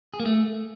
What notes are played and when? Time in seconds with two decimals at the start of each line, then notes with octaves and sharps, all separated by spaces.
0.14 G#4
0.20 A#3
0.26 A3